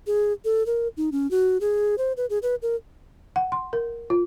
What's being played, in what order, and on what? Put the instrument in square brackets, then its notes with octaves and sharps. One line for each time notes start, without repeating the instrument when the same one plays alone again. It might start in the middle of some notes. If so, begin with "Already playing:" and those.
[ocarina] G#4
A4
A#4
D#4
C#4
F#4
G#4
C5
B4
G#4
B4
A#4
[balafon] F#5
C6
A#4
F4